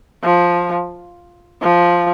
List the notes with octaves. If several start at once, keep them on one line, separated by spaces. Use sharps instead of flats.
F3
F3